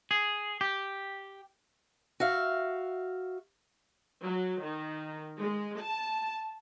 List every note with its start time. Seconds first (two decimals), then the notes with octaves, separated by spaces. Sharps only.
0.11 G#4
0.61 G4
2.20 F#4 E5 F5
4.24 F#3
4.63 D#3
5.40 G#3
5.80 A5